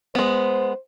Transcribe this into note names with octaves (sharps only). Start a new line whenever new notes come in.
G#3 B3 C5